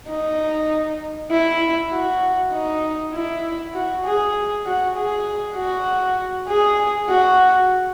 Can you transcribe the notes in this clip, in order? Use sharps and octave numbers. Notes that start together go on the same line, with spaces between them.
D#4
E4
F#4
D#4
E4
F#4
G#4
F#4
G#4
F#4
G#4
F#4